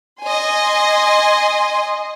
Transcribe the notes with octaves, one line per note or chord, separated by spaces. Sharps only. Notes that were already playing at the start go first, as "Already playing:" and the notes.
D#5 G#5 C6